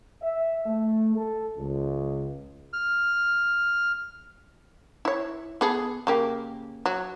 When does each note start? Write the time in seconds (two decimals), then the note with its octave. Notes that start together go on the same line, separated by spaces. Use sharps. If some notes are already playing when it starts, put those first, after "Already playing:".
0.22 E5
0.66 A3
1.16 A4
1.58 C#2
2.73 F6
5.05 E4 C#5
5.61 B3 G#4 A4
6.07 C#3 A#3 G4
6.86 F#3